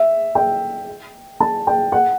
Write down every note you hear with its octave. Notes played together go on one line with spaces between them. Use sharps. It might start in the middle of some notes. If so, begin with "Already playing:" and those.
Already playing: E5
G5
A5
G5
F#5